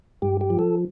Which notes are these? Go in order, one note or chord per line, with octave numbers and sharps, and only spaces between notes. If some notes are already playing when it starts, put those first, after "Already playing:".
G2 G4
G4
F3
A4